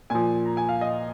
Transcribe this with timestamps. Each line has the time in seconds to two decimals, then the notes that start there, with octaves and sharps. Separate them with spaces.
0.10 A#2 F3 G#5
0.46 A#5
0.57 G#5
0.69 F5
0.81 D#5